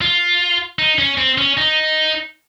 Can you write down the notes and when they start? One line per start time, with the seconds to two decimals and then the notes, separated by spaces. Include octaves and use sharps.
0.01 F4
0.79 D#4
0.99 C#4
1.18 C4
1.38 C#4
1.57 D#4